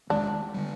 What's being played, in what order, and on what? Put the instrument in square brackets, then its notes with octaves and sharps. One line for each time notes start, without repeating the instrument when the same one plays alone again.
[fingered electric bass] F1 D#2 D#3 G#3 [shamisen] D4
[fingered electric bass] D3 G3